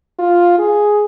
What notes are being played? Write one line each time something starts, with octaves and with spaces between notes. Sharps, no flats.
F4
G#4